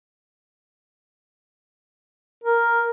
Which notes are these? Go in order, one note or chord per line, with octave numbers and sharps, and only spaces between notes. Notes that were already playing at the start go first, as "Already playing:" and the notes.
A#4